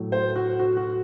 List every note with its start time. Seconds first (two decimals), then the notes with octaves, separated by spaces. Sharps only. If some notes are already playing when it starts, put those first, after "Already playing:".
Already playing: A2 F#3
0.12 C5
0.35 F#4
0.59 F#4
0.77 F#4